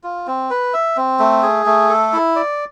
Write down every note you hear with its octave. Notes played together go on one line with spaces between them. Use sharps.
F4
C4
B4
E5
C4
A3
G#4
A3
A4
E4
D5